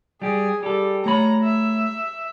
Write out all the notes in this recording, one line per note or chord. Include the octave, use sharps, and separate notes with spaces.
G3 G4 G#4
G3 G4 A4
A3 C#5 A#5 B5
E5